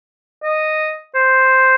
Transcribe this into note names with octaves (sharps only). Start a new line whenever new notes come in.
D#5
C5